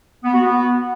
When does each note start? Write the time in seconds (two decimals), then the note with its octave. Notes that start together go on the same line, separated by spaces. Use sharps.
0.24 B3
0.34 F#4
0.44 B3